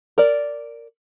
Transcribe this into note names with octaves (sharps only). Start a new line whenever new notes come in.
A#4 D5